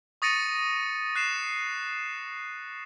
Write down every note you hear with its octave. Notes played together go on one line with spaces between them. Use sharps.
C#6 D#6 A6 A#6 C#7 D#7
F#6 C7 E7